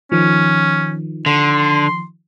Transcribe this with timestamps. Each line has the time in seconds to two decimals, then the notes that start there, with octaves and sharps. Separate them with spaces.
0.12 D#3 F3 C#4
1.26 D3 C6